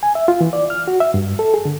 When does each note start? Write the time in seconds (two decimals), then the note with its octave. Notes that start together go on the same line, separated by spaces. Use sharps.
0.03 G#5
0.15 E5
0.28 F4
0.41 E3
0.53 D5
0.70 F6
0.88 F#4
1.00 E5
1.14 G2
1.39 A4
1.54 G#4
1.65 D3